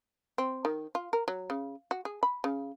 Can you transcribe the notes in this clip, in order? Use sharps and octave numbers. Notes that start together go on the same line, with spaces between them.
C4
D#3
F4
A#4
F#3
C#3
F#4
G#4
B5
C#3